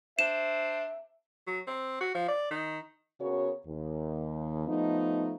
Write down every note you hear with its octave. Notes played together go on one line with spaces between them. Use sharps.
D4 C5 E5 E7
F#3
C4
F#4
F3
D5
D#3
C#3 B3 F#4 A#4 C#5
D#2
F3 A3 B3 D#4